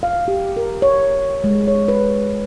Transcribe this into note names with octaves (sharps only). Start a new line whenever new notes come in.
F5
G4
A#4
C#5
G#3
C#5
B4